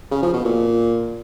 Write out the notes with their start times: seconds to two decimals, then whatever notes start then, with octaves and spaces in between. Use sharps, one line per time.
0.11 C#3
0.22 F3
0.34 B2
0.45 A#2